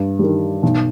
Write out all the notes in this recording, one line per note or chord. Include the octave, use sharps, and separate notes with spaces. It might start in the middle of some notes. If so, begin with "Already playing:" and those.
Already playing: G2
D#3 G3
B1